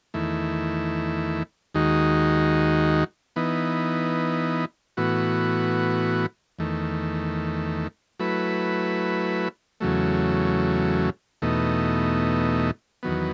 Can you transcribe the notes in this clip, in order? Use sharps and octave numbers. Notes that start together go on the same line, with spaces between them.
E2 D#3 A3 E4
D#2 D#3 G#3 D#4 F#4
E3 B3 D#4
A2 E3 B3 F#4
E2 D#3 A3
F#3 A3 E4 B4
E2 C#3 F#3 A3
E2 B2 A3 D#4
E2 D#3 F#3 B3